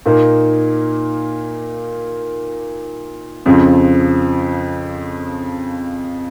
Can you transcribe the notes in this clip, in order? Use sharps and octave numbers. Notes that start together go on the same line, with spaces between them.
A#2 A#3 D#4
F2 C#3 F3